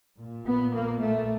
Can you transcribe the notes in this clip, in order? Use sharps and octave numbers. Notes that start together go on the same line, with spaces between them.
A#2
B3
A#3
A3